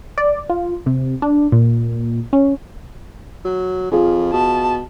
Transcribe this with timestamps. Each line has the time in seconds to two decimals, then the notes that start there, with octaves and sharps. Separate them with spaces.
0.18 D5
0.49 F4
0.86 C3
1.22 D4
1.52 A#2
2.33 C#4
3.45 F#3
3.91 F2 F4 G#4
4.33 B2 A5